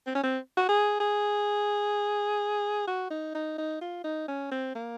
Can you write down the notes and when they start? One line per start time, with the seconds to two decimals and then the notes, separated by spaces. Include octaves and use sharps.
0.07 C4
0.15 C#4
0.24 C4
0.57 F#4
0.69 G#4
1.00 G#4
2.87 F#4
3.10 D#4
3.35 D#4
3.58 D#4
3.81 F4
4.04 D#4
4.28 C#4
4.51 C4
4.75 A#3